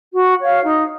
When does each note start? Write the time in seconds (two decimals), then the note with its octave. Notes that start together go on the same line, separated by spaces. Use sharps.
0.14 F#4
0.39 C#5 F5
0.64 D#4